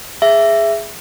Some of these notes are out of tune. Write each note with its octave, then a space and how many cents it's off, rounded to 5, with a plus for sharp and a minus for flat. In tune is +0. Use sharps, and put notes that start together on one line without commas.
G#4 +0 E5 +15